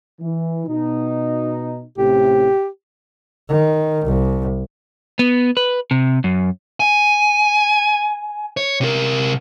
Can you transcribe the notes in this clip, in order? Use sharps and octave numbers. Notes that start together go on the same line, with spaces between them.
E3
B2 D#4
A1 A2 C3 G4
D#3
C2
B3
B4
C3
F#2
G#5
C#5
C3 A#4